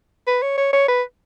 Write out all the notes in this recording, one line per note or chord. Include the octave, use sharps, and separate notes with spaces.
B4
C#5
C#5
C#5
B4